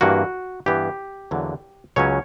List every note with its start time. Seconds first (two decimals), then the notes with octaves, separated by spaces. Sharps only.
0.01 G2 E3 A#3 F#4
0.66 G2 E3 B3 G4
1.31 E2 D3 F#3 A#3
1.96 C#2 C#3 F#3 C#4 C#5